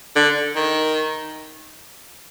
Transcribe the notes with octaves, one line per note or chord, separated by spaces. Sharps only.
D3
D#3